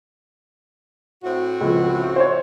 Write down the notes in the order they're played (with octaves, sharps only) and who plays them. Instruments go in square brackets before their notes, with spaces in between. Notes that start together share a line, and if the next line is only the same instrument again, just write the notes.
[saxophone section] A2 C4 F#4
[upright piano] C#2 F3
C5 C#5